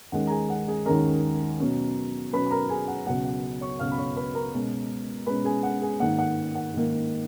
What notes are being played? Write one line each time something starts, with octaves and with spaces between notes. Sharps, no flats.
D#2 D#3 G#3 C#4 F#5
A#5
G#4 G#5
F#5
G#4 G#5
D#2 D#3 G#3 C#4 A#4 A#5
B2 F#3 C#4
B2 F#3 C#4 B4 B5
B5
A#4 A#5
G#4 G#5
F#5
C#2 B2 F#3 F#5
F#5
C#5 C#6
C#2 B2 F#3 F5 F6
B5
C#5 C#6
B4 B5
A#4 A#5
B2 G#3 C#4
B2 G#3 C#4 B4 B5
G#4 G#5
F#5
G#4 G#5
G#2 D#3 A#3 F#5
F#5
F#5
G#2 D#3 A#3